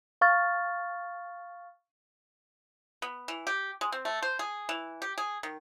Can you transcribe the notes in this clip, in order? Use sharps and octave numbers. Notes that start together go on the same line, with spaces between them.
F5 C#6 F6 A6
B3
E3
G4
G#3
C4
A3
C5
G#4
E3
G4
G#4
D#3